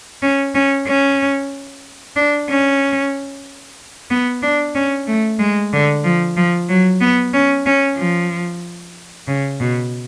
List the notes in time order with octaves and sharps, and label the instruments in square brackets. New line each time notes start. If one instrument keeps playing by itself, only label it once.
[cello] C#4
C#4
C#4
D4
C#4
B3
D4
C#4
A3
G#3
D3
F3
F3
F#3
B3
C#4
C#4
F3
C#3
B2